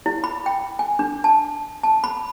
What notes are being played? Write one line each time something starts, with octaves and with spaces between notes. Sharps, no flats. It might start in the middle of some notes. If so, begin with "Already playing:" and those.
E4
B5
G5
G#5
D4
A5
A5
B5